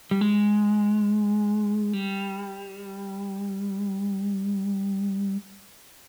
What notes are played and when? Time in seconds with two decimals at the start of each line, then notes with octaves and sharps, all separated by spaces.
0.11 G3
0.21 G#3
1.93 G3